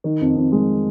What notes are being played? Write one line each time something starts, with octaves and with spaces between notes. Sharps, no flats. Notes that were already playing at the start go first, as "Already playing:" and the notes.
D#3
F2
F2
G#3